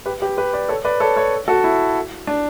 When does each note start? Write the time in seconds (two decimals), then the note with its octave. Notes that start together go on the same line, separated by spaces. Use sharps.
0.06 G4 B4
0.22 G4 B4
0.37 G4 B4
0.53 B4 D5
0.69 A4 C#5
0.85 B4 D5
1.00 A4 C#5
1.16 A4 C#5
1.48 F#4 A4
1.64 E4
2.27 D4